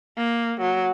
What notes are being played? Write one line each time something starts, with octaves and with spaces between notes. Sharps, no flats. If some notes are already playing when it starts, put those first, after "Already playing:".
A#3
F#3